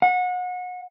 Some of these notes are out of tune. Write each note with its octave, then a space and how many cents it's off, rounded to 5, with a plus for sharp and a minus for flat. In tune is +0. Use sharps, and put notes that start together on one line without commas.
F#5 -30